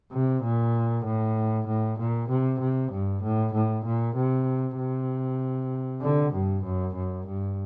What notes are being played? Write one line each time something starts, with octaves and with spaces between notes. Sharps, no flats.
C3
A#2
A2
A2
A#2
C3
C3
G2
A2
A2
A#2
C3
C3
D3
G2
F#2
F#2
G2